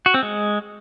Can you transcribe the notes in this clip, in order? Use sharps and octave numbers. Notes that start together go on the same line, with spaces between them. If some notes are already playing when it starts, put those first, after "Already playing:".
F#4
C4
G#3